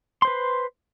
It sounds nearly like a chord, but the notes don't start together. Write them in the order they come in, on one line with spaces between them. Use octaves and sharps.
C6 C5 B4